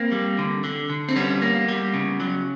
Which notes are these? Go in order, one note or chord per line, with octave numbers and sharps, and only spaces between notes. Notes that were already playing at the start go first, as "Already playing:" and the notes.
Already playing: A#3 C4
G3
D3
D3
D3
C4
G3 B3 C#4
A#3
G3
C#3
F#3